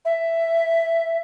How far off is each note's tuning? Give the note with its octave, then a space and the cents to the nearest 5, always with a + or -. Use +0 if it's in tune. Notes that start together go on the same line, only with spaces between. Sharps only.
E5 +5